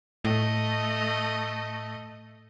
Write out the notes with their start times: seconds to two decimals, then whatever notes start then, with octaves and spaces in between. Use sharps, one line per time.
0.25 A2 A3 D#5